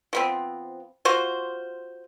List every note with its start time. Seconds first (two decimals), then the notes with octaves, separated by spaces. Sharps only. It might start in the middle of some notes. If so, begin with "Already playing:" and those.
0.13 F3 B3 C4
1.05 F4 F#4 C5